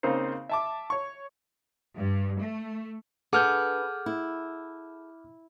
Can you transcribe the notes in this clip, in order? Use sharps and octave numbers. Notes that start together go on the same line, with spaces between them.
C#3 A#3 C4 D#4 C5
E5 A5 D6
C#5 C#6
G2
A3
D4 G#4 A4 B4 F#5 D6 F6 G6
E4